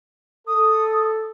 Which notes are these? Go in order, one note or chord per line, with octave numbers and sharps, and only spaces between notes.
A4 D#6